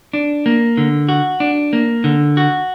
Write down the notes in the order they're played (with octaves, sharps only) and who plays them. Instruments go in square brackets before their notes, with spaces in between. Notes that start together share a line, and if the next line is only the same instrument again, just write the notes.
[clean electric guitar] D4
A#3
D3
F#4
D4
A#3
D3
F#4